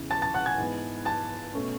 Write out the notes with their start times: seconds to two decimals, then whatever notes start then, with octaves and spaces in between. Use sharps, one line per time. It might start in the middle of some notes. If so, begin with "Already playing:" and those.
Already playing: E2 C#3 E3
0.11 A5 A6
0.22 A5 A6
0.34 F#5 F#6
0.46 G#5 G#6
0.58 G#2 E3 B3
1.05 A5 A6
1.54 B2 A3 C#4